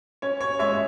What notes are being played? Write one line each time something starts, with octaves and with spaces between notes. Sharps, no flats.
C#4 C#5
C#5
G#3 C#5 E5